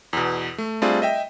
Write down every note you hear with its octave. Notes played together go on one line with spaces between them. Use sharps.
E2 B2
A3
G3 A3 C4 D4 F4 G#4
D#5 E5 G5